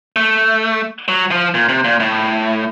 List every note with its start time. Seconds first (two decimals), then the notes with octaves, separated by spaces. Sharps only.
0.16 A3
1.08 F#3
1.31 F3
1.54 A#2
1.69 C3
1.84 A#2
2.00 A2